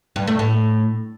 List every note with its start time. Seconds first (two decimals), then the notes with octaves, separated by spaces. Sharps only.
0.16 G2
0.27 A3
0.39 A2